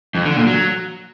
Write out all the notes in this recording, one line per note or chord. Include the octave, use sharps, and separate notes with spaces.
F2
D3
A#2
F#3